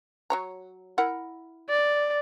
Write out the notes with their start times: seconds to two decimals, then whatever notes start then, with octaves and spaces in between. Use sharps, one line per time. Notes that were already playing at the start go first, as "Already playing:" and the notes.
0.30 F#3 C#5 A#5
0.98 E4 A#4 F#5
1.69 D5